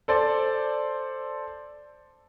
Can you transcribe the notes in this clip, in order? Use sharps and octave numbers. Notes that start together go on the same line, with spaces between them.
A4 C5 D5